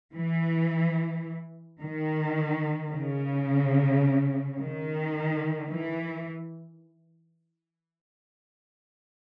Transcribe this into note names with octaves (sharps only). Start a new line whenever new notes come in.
E3
D#3
C#3
D#3
E3